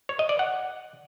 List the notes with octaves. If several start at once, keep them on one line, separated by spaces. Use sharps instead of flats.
C#5
D#5
D5
F#5